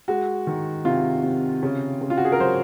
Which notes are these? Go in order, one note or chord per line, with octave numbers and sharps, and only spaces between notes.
G#3 F#4
D#3
C3 F4
C3
C#3
C#3
F4
F#4
G#4
A#4
F#3 C5